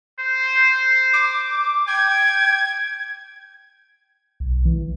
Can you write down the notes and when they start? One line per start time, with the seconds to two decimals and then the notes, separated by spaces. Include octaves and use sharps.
0.19 C5
1.13 D6
1.87 G5 G#6
4.40 B1
4.65 E3